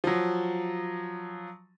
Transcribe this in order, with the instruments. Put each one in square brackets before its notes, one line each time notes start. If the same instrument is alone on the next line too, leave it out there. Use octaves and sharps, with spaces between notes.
[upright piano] F3 F#3